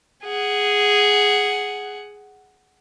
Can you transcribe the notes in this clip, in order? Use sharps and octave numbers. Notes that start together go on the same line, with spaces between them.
G#4 F#5